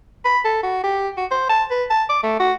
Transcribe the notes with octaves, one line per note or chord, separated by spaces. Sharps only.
B5
A4
F#4
G4
F#4
C5
A5
B4
A5
D6
A3
F#4